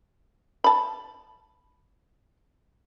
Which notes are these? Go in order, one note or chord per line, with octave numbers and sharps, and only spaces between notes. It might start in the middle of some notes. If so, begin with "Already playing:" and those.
A5 B5